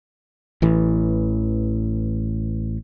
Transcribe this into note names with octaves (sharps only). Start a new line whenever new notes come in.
A1 E3